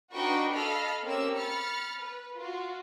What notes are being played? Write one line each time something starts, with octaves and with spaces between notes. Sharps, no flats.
D4 D#4 F#4 B4 G5 C#6
A4 D#5 F5 B5 F6
A#3 C4 C#4 G4 C#5 E6
B5 F6 A6 C#7
B4
F4 F#4